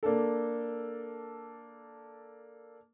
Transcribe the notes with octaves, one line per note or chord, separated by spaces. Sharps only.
A#3 D4 A4